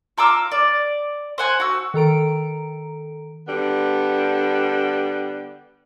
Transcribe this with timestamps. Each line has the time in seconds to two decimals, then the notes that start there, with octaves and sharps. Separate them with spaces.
0.18 F4 A#5 D6 E6
0.52 D5
1.38 C5 F#5 G#5
1.60 F#4 E6
1.94 D#3 A4 A#5 D7
3.48 D3 G3 B3